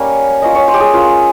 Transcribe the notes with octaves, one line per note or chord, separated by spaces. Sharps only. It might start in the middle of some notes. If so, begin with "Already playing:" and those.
Already playing: G3 A#3 C#4 F5
A#3 C#4 F4 D#5
C#5
C5
G4
G#4
A#3 C#4 F4